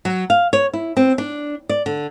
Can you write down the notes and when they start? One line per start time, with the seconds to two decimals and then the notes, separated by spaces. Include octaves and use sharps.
0.05 F#3
0.30 F5
0.53 C#5
0.73 E4
0.97 C4
1.18 D4
1.69 D5
1.86 D3